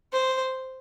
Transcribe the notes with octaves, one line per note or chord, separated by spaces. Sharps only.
C5